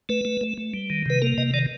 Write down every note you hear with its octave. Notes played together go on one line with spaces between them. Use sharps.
A3 B4
A3
A3
A3
G3
D#3
C3 B4
A#3 A#4
C3 D#5
D#3 D5